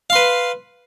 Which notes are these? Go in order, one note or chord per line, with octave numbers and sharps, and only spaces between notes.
B4 F5 C6